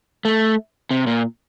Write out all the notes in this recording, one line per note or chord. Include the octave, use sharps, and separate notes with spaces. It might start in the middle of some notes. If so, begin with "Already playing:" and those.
A3
C3
A#2